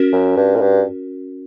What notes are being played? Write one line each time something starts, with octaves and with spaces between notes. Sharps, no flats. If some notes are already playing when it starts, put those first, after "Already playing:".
Already playing: C#4 F#4 A#4
F#2
G2
A#2
G2